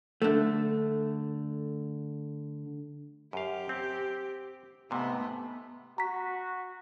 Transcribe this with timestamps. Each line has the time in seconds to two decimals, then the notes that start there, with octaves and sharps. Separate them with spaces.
0.22 D3 A3
3.33 F#2 G4 F5
3.69 C4
4.91 G#2 C3 A3 B3
5.98 F#4 A#5 B6